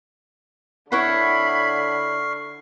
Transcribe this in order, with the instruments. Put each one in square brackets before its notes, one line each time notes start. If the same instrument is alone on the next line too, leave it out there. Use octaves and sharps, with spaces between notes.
[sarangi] D3 [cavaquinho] E4 C#5 F#5 [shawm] B5 [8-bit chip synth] C#6 F6 C7